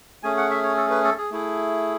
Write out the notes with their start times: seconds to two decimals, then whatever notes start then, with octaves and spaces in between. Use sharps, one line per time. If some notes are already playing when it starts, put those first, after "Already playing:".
0.23 A3 C#4 G#4 G#5
0.37 F#5
0.50 E5
0.64 C#5
0.77 A4
0.90 B4
1.04 A4
1.18 G#4
1.31 A3 E4 G#4